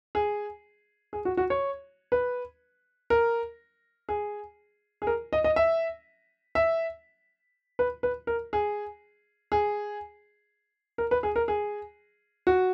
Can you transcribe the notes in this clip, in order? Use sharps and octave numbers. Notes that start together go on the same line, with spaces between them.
G#4
G#4
F#4
F#4
C#5
B4
A#4
G#4
G#4
A#4
D#5
D#5
E5
E5
B4
B4
A#4
G#4
G#4
A#4
B4
G#4
A#4
G#4
F#4